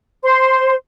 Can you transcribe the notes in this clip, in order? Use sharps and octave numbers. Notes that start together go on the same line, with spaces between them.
C5 C6